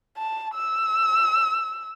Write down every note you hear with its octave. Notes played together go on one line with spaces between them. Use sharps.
A5
E6